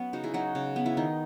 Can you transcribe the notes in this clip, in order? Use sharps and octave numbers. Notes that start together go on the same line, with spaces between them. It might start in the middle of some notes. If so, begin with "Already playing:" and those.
Already playing: F#3 B3 C#4
C#3 D#4 F#4
E4 G#4
F#3 D#4 F#4
C#3
B3
E4
D#3 D#4